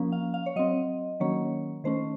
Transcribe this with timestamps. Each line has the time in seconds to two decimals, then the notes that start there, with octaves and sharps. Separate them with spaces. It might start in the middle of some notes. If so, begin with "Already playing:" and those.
Already playing: F3 A#3 C#4
0.12 F5
0.34 F5
0.46 C#5
0.56 F#3 C4 D#5
1.20 D#3 F#3 A#3 C#4 C#5
1.84 D#3 A3 C#4 C5